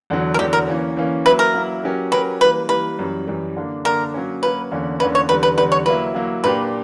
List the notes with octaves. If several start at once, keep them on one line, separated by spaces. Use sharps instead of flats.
E2 D3 F#3
A#4
E2 D3 F#3 G4
A#4
E3 A#3 C#4
E3 A#3 C#4
F#3 A#3 E4 B4
A#4
F#3 A#3 E4
F#3 C#4 G4 A#4
F#3 C#4 G4 A#4 B4
E3 G3 A#3 B4
E3 G3 A#3 B4
F#2 E3 G3
F#2 E3 G3
D3 A#3 D4
D3 A#3 D4 A#4
F#3 A#3 C#4
F#3 A#3 C#4 B4
E2 D3 A#3 C#4
E2 D3 A#3 C#4 B4
C#5
E2 D3 G3 B4
B4
E2 D3 G3 B4
C#5
F#3 A#3 E4 B4
F#3 A#3 E4
A#2 A#3 D4 G4 B4